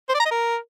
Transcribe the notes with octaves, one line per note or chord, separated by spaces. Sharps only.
C5
D5
A#5
D#5
A#4